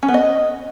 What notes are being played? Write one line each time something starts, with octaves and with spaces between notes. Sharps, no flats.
C#4
B3
D#5